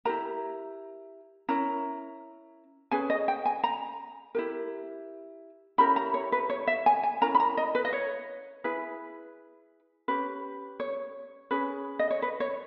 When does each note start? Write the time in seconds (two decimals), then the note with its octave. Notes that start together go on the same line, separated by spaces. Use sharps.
0.05 E4 G4 A#4 A#5
1.48 C#4 E4 A#4 A#5
2.91 C#4 G#4 B4 G#5
3.10 D#5
3.28 G5
3.45 G#5
3.63 A#5
4.35 E4 G4 A#4
5.78 C#4 E4 G4 A#4 B5
5.96 A#5
6.14 C#5
6.32 B4
6.50 C#5
6.67 E5
6.86 G#5
7.03 G#5
7.21 C#4 E4 A#4 A#5
7.35 B5
7.40 A#5
7.57 D#5
7.75 B4
7.85 D#5
7.93 C#5
8.64 E4 G#4 B4
10.08 C#4 G4 B4
10.80 C#5
11.51 C#4 G#4 B4
11.99 D#5
12.10 C#5
12.22 B4
12.40 C#5